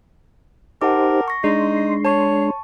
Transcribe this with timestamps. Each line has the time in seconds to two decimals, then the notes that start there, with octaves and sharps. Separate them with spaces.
0.82 D#4 G4 A#4 C5 F#5 A5 D6
1.28 C#6 A#6
1.44 G#3 D4 D#4 C6
2.05 C#5 A5 C#6